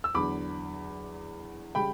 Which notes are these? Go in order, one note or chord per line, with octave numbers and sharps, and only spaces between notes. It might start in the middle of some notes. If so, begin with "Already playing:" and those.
E6
E2 D3 F#3 B5 D6
C#3 G3 G5 B5